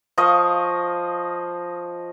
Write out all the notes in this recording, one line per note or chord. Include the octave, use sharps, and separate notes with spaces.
F3 D#5 F5 C#6